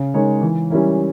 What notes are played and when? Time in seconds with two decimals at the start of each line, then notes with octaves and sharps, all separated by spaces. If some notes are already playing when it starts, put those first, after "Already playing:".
Already playing: C#3
0.14 G#3 D#4 A#4 C#5
0.41 E3
0.70 G3 C#4 E4 A#4